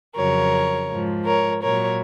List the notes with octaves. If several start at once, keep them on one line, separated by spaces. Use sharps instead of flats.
F2 C#3 F#3 A#4 C#5
G#2 F3
A#4 C#5
A#2 F#3 A#4 C#5